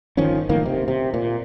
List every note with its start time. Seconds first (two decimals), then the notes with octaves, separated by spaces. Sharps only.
0.17 G1 D#3 F3 C#4
0.49 F#1 A2 D#3 A#3
0.65 C3
0.88 C3
1.14 A#2